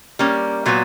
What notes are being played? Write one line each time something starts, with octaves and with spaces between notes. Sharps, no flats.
G3 A#3 C#4
A#2 F#3 B3